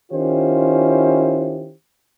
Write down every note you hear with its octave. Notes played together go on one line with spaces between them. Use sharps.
D#3 C#4 E4 F4 G4 C5